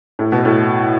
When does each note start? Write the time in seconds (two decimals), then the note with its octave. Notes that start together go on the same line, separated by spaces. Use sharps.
0.19 A2
0.32 B2
0.45 A2